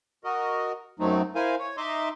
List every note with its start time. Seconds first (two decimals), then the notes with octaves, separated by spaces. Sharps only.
0.24 F#4 A#4 D#5
1.00 F#2 F#3 A3 C4 D#4
1.35 E4 A#4 C5 F5 G#5
1.59 C#5
1.77 D#4 D#5 E5 C6 D6